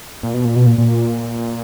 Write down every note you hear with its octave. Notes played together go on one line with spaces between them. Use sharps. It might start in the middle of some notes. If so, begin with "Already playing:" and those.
A#2
B2
A#2
B2
A#2
A#2